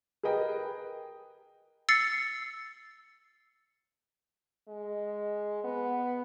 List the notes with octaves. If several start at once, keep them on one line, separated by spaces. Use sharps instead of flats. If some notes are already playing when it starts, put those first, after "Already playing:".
G#4 A#4 B4 D#5 G5
E6 A6 C7 C#7
G#3
B3